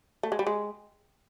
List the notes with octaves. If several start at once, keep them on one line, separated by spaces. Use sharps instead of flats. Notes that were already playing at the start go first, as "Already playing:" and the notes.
A3
G#3
G3
G#3